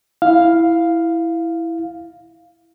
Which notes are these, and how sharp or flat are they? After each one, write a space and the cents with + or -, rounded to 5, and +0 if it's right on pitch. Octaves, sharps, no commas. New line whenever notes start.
E4 +0 F5 +0